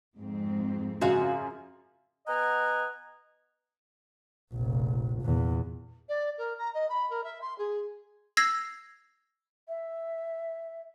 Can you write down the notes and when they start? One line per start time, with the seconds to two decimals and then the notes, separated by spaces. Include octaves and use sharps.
0.17 F2 G#2 C4
1.01 F#2 C#3 F4 F#4 F5
2.27 B3 D#5 F#5 G#5 A#5
4.52 F1 A#1
5.22 E2 A#2
6.08 D5
6.37 A#4
6.58 A#5
6.74 D#5
6.89 B5
7.10 A#4
7.23 E5
7.41 C6
7.58 G#4
8.37 E6 G#6 A#6 C7
9.68 E5